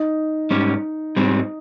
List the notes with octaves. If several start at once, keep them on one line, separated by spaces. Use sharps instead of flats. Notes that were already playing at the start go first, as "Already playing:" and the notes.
Already playing: D#4
G#2 G3 C#4
G#2 G3 C4